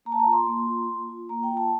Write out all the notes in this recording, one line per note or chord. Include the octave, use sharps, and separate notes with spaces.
A#3 A#5
A5
A#5
F4
C6
A#3
F4
A#3
F4
A#3 A#5
G5
F4
A5